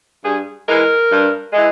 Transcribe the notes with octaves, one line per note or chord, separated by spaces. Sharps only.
G2 G#4
E3 G#3 A#4
G2
E3 G#3